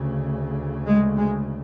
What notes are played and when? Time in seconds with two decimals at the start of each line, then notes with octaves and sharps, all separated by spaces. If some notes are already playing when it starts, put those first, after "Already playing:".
Already playing: D2 C#3
0.86 G#3
1.17 G#3